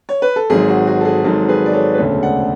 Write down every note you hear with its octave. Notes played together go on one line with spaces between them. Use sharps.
C#5
B4
A4
G#1 G#2 F#3 G#4
F#4
F#4
A4
G#4
G#1 G#2 F#3 F#4 A4
G#4 B4
D5
A4 C#5
B4
E1 D2 C#3 A4 C#5
D5 F#5